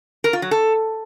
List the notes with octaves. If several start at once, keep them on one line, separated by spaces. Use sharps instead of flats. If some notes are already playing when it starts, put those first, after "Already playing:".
A#4
F4
F#3
A4